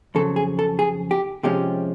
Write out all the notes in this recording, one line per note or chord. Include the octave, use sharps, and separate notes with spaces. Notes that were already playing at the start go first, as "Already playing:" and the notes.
F2 C#3 F#3 A4
G#4
A4
G#4
G4
C3 F3 G#3 C#4 G4